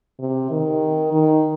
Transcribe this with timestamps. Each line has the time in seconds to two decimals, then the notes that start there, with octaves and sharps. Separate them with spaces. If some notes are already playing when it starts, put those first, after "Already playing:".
0.19 C3
0.50 D#3
1.13 D#3